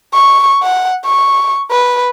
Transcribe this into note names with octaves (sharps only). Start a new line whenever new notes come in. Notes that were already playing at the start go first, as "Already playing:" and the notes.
C#6
F#5
C#6
B4